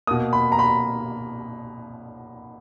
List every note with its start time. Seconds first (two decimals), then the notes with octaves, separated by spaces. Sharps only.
0.07 B2 A#3 D#6
0.33 B5
0.52 A#5
0.59 B5